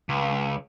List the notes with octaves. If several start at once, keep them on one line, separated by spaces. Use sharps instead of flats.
C#2